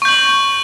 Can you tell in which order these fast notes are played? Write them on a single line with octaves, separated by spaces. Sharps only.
C#6 G6 F#7